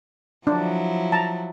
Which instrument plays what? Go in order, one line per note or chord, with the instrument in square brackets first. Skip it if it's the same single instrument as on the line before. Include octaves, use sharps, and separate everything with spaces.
[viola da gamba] F3 F#3 E4 [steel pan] D4
[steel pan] A5 A#5